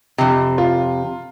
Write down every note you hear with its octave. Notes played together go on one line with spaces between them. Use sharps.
F2 C3
F4